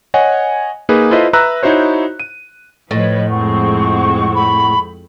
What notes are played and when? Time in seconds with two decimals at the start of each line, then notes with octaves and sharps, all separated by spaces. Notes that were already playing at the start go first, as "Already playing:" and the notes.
0.14 C#5 D#5 F#5 G#5
0.89 A#3 D#4 G#4 B4
1.11 E4 F4 A4 B4 C5 D#5
1.33 B4 E5 A#5 E6 F#6
1.63 D#4 E4 F#4 C5 C#5
2.20 D#7
2.91 A2 F3 B4 C#5 D#5
3.29 F2 G#3 C4 F#5 C#6
4.35 B5